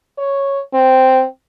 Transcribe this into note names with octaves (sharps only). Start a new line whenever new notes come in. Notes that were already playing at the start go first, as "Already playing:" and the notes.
C#5
C4